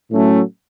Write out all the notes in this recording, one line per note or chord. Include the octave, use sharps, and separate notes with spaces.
A2 F#3 A3 C#4